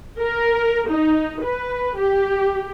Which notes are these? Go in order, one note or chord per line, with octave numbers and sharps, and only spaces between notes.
A#4
D#4
B4
G4